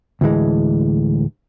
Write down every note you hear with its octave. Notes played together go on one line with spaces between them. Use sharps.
D2 A2 E3 G#3